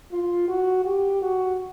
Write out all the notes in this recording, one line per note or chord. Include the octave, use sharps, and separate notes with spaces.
F4
F#4
G4
F#4